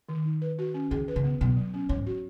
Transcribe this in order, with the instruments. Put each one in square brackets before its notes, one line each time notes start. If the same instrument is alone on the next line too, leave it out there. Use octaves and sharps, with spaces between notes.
[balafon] D#3
D#4
B4
F#4
C#4
[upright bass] D#3 [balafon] G#4
[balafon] B4
[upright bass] C#3
[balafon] B3
[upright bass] B2 [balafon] F#3
[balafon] F#3
C#4
[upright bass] G#2 [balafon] C#5
[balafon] F#4